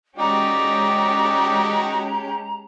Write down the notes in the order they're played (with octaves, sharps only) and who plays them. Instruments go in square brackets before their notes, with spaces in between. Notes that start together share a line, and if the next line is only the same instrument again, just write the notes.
[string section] G#3 C#4 G4 [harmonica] D#4 F#4 G5 [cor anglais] D5 [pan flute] A#5